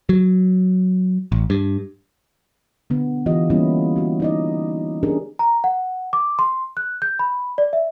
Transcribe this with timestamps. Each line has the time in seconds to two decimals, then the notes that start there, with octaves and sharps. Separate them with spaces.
0.09 F#3
1.32 A1
1.50 G2
2.90 D3 B3
3.26 E3 F4 G4 D#5
3.50 G3 A#3 B3 C#4 E4
3.96 B3 F#4
4.20 D#4 D5 D#5
5.03 C#4 D4 G4 G#4 A#4
5.39 A#5
5.64 F#5
6.13 D6
6.39 C6
6.77 F#6
7.02 G6
7.19 B5
7.58 D5
7.73 E5